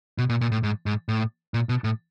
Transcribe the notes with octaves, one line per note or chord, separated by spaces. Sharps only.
B2
A#2
A#2
A2
G#2
G#2
A2
A#2
B2
A2